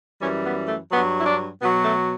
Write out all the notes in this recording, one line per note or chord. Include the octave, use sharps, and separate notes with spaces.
F#2 E3 G3 C#4
B3
A3
G2 F#3 B3
E4
D4
B2 F#3 B3
A3